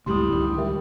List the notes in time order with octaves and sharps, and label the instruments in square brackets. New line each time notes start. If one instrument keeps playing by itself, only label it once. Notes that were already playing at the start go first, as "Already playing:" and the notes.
[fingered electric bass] C#2 F#2 C#3 [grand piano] A2 G3 [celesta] C6 D#6
[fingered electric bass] C#2 D3 D#3
[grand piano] G3 [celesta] A#4 E5 G5